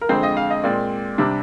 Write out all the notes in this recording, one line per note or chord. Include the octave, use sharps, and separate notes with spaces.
A#4
F2 D3 G#3 C4 C5
D#5
F5
D#5
A#2 G#3 C4 D5
C3 G3 D4